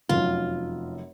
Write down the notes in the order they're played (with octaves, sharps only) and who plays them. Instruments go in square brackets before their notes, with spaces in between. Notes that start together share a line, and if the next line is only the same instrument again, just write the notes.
[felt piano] F1 F#2 [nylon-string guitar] F4